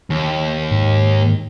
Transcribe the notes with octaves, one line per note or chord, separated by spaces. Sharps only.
D#2
G#2